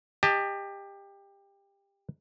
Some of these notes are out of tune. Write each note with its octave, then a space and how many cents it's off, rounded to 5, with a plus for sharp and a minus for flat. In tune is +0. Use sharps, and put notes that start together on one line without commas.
G4 +20 D#5 -5 A5 +0